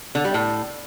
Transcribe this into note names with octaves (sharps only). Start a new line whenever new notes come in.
D3
G3
A2